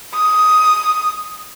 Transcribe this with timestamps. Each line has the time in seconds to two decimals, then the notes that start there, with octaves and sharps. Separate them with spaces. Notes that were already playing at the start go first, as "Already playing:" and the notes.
0.14 D#6